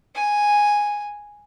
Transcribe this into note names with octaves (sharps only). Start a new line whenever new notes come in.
G#5